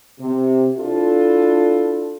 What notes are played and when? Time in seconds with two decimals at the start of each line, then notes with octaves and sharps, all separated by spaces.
0.19 C3
0.77 D4 E4 F4 A4